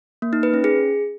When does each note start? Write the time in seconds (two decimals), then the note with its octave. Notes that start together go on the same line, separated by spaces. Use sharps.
0.22 A#3
0.33 D#4
0.43 B4
0.54 C#4
0.64 G#4